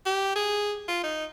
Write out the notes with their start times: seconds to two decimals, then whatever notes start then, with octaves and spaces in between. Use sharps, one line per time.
0.06 G4
0.35 G#4
0.88 F4
1.03 D#4